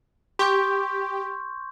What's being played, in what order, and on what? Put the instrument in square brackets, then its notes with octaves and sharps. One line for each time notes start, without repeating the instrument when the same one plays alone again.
[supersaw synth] G4 [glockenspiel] C6 C#6 G6